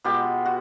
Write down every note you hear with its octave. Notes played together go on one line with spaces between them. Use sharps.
B2 G#3 F4 G4
F#4